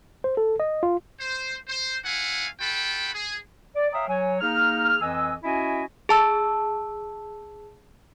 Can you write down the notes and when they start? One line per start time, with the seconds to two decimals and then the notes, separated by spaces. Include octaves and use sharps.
0.24 C5
0.37 A4
0.60 D#5
0.83 F4
1.21 C5
1.68 C5
2.04 A3 E4 F5 F#5 G#5
2.59 F4 F#4 A4 G5 B5
3.13 G#4
3.75 D5
3.93 C#5 E5 F5 G5 A#5 D#6
4.08 F#3 C#5 G#5
4.41 A#3 D#4 G#4 F6
5.01 F2 E3 D#5 G#5 E6
5.44 C#4 E4 F#4 D#5 E5 G#5
6.09 G#4 A5 E6